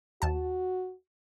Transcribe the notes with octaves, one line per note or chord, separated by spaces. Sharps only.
D#2 F#4 A5